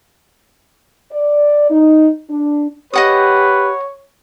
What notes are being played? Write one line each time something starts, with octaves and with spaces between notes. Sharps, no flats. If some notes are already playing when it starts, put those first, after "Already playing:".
D5
D#4
D4
G4 B4 C#5 D#5 F#5 D#6